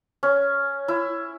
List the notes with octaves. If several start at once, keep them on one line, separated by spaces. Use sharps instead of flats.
C#4
E4